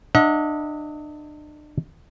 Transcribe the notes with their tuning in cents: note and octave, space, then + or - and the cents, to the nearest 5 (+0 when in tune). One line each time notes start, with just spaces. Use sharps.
D4 +35 D#5 +40 F#5 -30